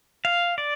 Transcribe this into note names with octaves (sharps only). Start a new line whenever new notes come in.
F5
D5